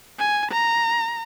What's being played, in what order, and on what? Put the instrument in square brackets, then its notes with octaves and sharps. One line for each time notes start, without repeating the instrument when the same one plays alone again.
[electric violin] G#5
A#5